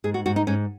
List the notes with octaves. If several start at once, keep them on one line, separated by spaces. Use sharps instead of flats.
G#2 G#4
F#4
G#2 F#4
D#4
G#2 C#4